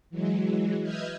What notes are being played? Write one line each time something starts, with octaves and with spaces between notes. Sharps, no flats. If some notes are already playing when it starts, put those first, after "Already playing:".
E3 F#3 G#3
B4 D#5 E5 F6 G6 G#6